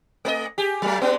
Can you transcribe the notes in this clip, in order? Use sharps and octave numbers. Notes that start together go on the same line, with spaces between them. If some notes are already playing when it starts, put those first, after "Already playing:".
A3 B4 D#5
G4 G#4
F#3 A3
G#3 B3 D4